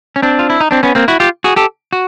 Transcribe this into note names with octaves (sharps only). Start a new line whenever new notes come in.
C#4
C4 D4
F4
E4
D#4
C4 D4
B3 C#4
A#3 C4
E4 F#4
F4 G4
F#4 G#4
G4 A4
F#4